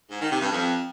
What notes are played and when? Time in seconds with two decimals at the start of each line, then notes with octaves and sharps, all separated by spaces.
0.11 G#2
0.21 D#3
0.31 C3
0.41 G2
0.51 F2